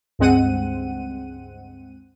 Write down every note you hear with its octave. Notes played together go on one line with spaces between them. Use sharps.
C#2 G2 G#3 C4 F#5 D#7